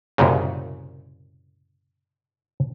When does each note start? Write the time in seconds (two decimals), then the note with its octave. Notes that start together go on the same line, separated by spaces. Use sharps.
0.18 C2 F#2 A#2 C#3